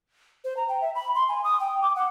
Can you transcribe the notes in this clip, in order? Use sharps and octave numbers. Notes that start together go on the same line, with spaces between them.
C5
A#5
G5
E5
B5
C6
G#5
D#6
G5
D6
F#5